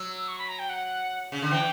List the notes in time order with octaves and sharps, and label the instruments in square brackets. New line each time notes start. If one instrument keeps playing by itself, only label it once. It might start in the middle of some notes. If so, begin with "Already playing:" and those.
Already playing: [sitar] F#3 [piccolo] E6
[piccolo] C#6
B5
A#5
G5
F#5
[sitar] C#3
D3
[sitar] E3 [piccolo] G5